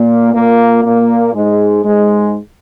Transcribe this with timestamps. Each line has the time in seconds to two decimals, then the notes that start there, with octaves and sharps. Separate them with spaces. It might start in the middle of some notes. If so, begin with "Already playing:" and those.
Already playing: A#2 A#3
0.34 A#2 A#3
0.84 A#2 A#3
1.34 G#2 G#3
1.85 G#2 G#3